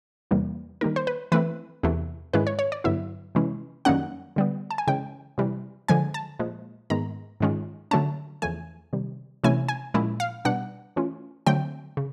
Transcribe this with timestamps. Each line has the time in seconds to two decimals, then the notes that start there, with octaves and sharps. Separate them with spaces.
0.31 E2 C3 E3 G3 A#3
0.81 D#3 G3 A#3 D#4 A#4
0.96 C5
1.07 B4
1.32 E3 A3 C4 E4 B4
1.83 E2 C3 E3 A3
2.33 G#2 D#3 G#3 C#4 E4 B4
2.47 C#5
2.59 C#5
2.72 D5
2.84 G2 D3 F#3 B3 E4 E5
3.35 C3 E3 G#3 C#4 E4
3.85 F#2 D#3 G3 A#3 C#4 F#5
4.36 D3 G3 B3
4.71 A5
4.78 G#5
4.87 C#3 E3 G#3 C#4 G5
5.38 C3 E3 G3
5.88 D3 F3 G#3 G#5
6.14 A5
6.39 A#2 F3 G#3
6.90 G#2 D#3 G#3 B3 A#5
7.40 G#2 D#3 G#3 C#4 F4
7.91 D3 F#3 A3 C#4 A5
8.42 E2 C#3 F3 A3 G#5
8.93 C3 D#3 G3
9.44 C3 E3 A3 C#4 E4 G#5
9.69 G#5
9.94 A#2 F3 G#3 C#4 E4
10.20 F5
10.45 B2 G3 B3 D4 F#5
10.96 E3 A3 C#4 F4
11.46 D3 F#3 A3 C4 G5
11.97 C#3